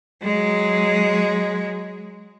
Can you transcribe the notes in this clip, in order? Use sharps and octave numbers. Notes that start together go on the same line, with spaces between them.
F#3 G#3